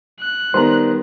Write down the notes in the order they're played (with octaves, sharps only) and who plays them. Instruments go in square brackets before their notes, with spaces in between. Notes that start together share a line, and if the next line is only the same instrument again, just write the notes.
[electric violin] F#6
[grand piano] D#3 B3 A#5 [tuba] G3 [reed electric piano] C5 C6